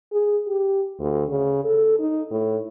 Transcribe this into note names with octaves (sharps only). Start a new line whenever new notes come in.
G#4
G4
D2
C#3
A4
D#4
A2